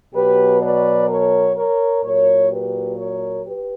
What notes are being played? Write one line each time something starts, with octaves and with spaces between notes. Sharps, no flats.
B2 F#3 G4 B4
B4 D5
A#4 C#5
A#4 C#5
A#2 F#3 A#4 C#5
G4 B4
A#4 C#5
G4 B4